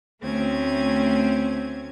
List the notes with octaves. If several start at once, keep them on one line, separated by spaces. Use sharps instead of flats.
D2 A3 C4 C#4 G#6